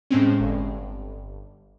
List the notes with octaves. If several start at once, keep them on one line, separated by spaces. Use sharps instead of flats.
A2 G#3 C4 C#4
G1